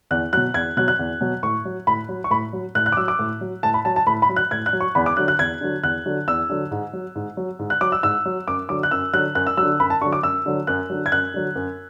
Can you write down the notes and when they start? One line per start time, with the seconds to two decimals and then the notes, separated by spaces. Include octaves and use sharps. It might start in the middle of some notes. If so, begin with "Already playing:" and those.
0.11 E2 F#6
0.33 B2 F#3 F#6
0.54 E2 G#6
0.77 B2 F#3 F#6
0.88 F#6
0.99 E2
1.21 B2 F#3
1.43 A2 C#6
1.65 F#3
1.87 A2 B5
2.09 F#3
2.24 C#6
2.31 A2 B5
2.53 F#3
2.75 A2 F#6
2.86 F#6
2.92 D6
2.97 F#3 E6
3.08 D6
3.19 A2
3.41 F#3
3.63 A2 A5
3.74 B5
3.85 F#3 A5
3.96 A5
4.07 A2 B5
4.22 B5
4.29 F#3
4.36 F#6
4.51 A2 G#6
4.66 F#6
4.73 F#3
4.80 C#6
4.95 E2 B5
5.06 D6
5.17 D3 F#3 F#6
5.28 F#6
5.39 E2 G#6
5.61 D3 F#3
5.83 E2 F#6
6.06 D3 F#3
6.28 E2 E6
6.49 D3 F#3
6.71 G#2
6.93 F#3
7.15 G#2
7.37 F#3
7.59 G#2
7.70 F#6
7.81 F#3 D6
7.92 E6
8.03 G#2 E6
8.25 F#3
8.47 F#2 D6
8.69 D3 F#3 D6
8.83 F#6
8.91 F#2 E6
9.13 D3 F#3 F#6
9.35 F#2 F#6
9.47 E6
9.57 F#3 E6
9.62 D3
9.79 F#2 B5
9.90 A5
10.01 D3 C#6
10.06 F#3
10.13 D6
10.23 F#2 E6
10.46 D3 F#3
10.67 F#2 F#6
10.90 D3 F#3
11.06 G#6
11.12 F#2 F#6
11.34 D3 F#3
11.56 F#2